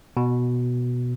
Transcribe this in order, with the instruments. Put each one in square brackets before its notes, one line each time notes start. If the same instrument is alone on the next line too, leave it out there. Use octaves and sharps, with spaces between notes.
[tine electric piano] B2